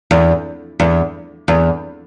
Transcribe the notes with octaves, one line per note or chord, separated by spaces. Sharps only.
E2
E2
E2